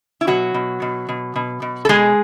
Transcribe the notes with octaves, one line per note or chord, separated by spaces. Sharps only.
E4
B2 F#3 F#4
B2
B2
B2
B2
B2
A4
B2 G#3 G#4